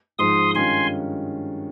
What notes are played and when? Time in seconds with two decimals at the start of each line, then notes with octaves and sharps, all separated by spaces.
0.18 G#2 F3 G#3 C6 D#6
0.54 G2 D#3 G#3 C#4 F4 G#5 C6